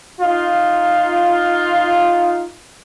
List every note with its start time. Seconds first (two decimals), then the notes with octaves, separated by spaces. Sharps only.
0.21 D#4 F4